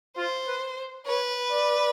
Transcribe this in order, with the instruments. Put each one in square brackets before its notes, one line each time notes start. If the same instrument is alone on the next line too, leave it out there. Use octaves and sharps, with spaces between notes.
[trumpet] F4 [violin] C5
[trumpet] B4
[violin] B4 [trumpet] C#5
[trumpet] D5